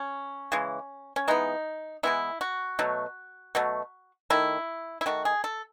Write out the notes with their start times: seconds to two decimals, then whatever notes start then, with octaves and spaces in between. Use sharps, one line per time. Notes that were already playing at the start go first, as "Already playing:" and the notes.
Already playing: C#4
0.52 C#3 E3 G#3
1.16 C#4
1.28 E3 G#3 B3 D#4
2.03 E3 G#3 B3 E4
2.41 F#4
2.79 B2 F#3 A3
3.55 B2 F#3 A3
4.30 D#3 A3 E4
5.01 E4
5.06 D#3 A3 F#4
5.25 G#4
5.44 A4